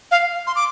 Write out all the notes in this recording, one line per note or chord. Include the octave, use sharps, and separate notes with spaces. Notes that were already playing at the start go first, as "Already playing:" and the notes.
F5
C6
D6